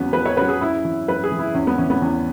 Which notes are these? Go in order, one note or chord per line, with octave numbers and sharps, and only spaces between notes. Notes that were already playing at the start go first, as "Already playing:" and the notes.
Already playing: E2 C#3 F#3 B3 C#4
E2 B4
C#5
C#3 F#3 B4
G#4
F#2 E4
E3
F#2 B4
G#4
E3
E4
E2 C#4
B3
E3 C#4
B3
E2 C#4